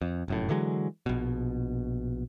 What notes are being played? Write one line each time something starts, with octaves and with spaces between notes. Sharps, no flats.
F2
F1 F#2 A2
D3 E3 F#3 G#3
A#1 B2